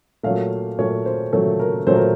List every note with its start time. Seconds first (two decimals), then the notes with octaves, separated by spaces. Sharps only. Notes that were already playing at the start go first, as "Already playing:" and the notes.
0.23 A#2 F#3 A3 F5
0.79 A#2 F#3 A3 C#5
1.06 C5
1.33 A#2 F#3 A3 A4
1.59 A#4
1.87 A#2 F#3 A3 C5
1.96 A#4